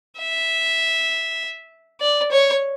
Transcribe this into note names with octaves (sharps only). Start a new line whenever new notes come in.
E5
D5
C#5